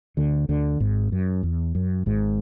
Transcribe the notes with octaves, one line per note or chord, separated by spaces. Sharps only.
D2 D3
D2 D3
G#1 G#2
F#2
E2
F#2
G#1 G#2